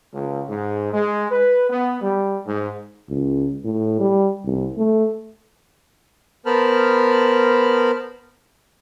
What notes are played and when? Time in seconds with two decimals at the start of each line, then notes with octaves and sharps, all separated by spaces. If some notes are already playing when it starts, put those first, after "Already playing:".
0.13 C#2
0.48 G#2
0.93 G#3
1.31 B4
1.69 B3
2.01 G3
2.46 G#2
3.09 C#2
3.64 A2
4.00 G3
4.45 C2
4.78 A3
6.46 B3 A#4 C5 A5 B5 F6